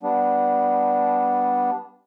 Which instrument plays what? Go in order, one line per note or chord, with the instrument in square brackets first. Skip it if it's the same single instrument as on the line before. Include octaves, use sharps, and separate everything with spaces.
[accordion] G3 B3 D4